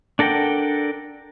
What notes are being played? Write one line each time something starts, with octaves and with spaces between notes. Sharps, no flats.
D4 A4 A#4 F#5 G5